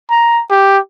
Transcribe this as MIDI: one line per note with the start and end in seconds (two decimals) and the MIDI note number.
0.11 0.42 82
0.50 0.78 67